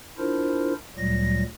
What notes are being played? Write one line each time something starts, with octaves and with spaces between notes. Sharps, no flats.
D4 E4 F4 A#4 C5
D2 A#2 F#3 G3 A#6